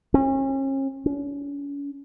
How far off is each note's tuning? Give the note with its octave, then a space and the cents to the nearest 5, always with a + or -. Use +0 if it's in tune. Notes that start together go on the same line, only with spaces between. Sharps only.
C#4 -40
C#4 +40